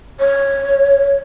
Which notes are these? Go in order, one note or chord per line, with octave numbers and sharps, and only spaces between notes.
C#5